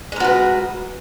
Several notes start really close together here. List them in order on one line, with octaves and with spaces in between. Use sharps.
G#3 A#4 F#4 B4